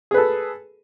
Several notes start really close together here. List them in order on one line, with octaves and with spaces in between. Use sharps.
G#4 B4 A4